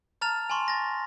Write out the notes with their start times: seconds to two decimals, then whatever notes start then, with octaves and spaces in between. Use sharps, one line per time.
0.21 A5 A#5 F6 A6 F7
0.50 G#5 A5 C6 C#6
0.68 A6 A#6